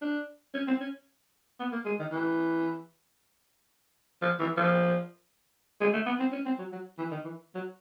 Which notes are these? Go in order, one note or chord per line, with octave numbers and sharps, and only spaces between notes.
D4
C#4
C4
C#4
B3
A#3
G#3
D#3
E3
F3
E3
F3
G#3
A3
B3
C4
C#4
C4
F#3
F#3
E3
D#3
E3
F#3